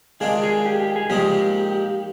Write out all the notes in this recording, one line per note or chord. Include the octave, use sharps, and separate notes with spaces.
D#3 G#3 D4 F4 G#4
G#4
G4
G4
G#4
A#2 F3 G#3 D#4 G4